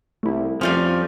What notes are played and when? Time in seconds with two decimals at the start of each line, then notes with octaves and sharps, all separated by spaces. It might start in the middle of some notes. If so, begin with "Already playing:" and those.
0.23 C2 A3 E4
0.61 F2 F3 G3 C#4 F4 G#5